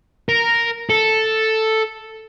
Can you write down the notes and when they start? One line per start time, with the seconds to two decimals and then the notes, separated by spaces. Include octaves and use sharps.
0.29 A#4
0.90 A4